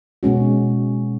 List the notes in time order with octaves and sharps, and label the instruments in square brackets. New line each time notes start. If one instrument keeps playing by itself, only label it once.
[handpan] B2 G#3 C#4 F#4